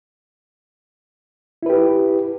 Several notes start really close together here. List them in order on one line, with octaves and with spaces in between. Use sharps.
E4 B4 G4